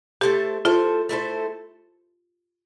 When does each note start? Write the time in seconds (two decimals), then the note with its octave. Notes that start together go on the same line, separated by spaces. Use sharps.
0.21 A3 E4 G4 A4 C5
0.65 A3 E4 F4 A4 C5
1.09 A3 E4 A4 C5